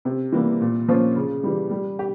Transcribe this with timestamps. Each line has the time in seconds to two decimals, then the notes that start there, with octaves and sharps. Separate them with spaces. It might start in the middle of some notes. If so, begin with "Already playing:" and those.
0.05 C3
0.32 E3 G3 A#3
0.61 A#2
0.88 F3 A#3 C#4 F4
1.16 C#3
1.43 E3 G3
1.71 G3
1.99 G4